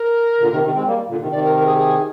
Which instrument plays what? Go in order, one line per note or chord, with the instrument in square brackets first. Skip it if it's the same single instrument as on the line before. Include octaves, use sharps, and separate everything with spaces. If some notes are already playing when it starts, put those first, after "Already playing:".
Already playing: [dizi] A#4
[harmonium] A#2 D3
C3 D#3
C3 D#3
G#3 C4
G3 A#3
A#2 D3
C3 D#3
[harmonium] C3 D#3 [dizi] D5
[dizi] A#4
A#4
G#4
G#4